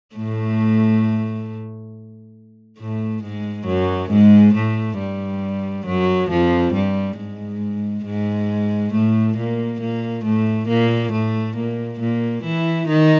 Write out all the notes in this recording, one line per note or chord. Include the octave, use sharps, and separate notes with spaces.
A2 A3
A2 A3
G#2 G#3
F#2 F#3
G#2 G#3
A2 A3
G2 G3
F#2 F#3
F2 F3
G2 G3
G#2 G#3
G#2 G#3
A2 A3
A#2 A#3
A#2 A#3
A2 A3
A#2 A#3
A2 A3
A#2 A#3
A#2 A#3
E3 E4
D#3 D#4